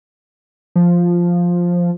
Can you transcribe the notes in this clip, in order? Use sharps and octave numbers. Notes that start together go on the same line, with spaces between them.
F3